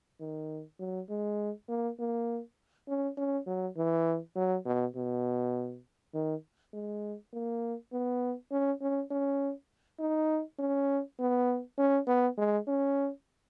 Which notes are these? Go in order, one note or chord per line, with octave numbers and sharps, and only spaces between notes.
D#3
F#3
G#3
A#3
A#3
C#4
C#4
F#3
E3
F#3
B2
B2
D#3
G#3
A#3
B3
C#4
C#4
C#4
D#4
C#4
B3
C#4
B3
G#3
C#4